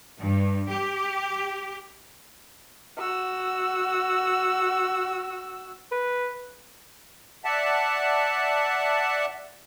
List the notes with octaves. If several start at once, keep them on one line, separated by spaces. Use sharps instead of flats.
G2
G4
F#4 E6
B4
D5 E5 F#5 A5